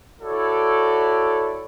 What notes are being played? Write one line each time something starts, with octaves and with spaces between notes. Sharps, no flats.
E4 F#4 A4 C#5 D5